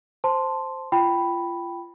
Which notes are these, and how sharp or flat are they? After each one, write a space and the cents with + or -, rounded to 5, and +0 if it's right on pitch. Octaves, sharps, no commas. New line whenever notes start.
C5 +0 A5 +0 C6 +0
F4 -25 G5 -5 B5 +0